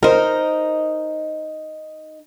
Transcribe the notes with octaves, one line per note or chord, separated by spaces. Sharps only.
D#4 A#4 C5 D#5